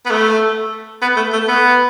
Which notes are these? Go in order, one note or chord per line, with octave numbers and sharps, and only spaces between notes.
B3
A3
B3
A3
A3
B3